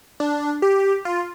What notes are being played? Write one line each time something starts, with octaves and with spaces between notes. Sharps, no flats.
D4
G4
F4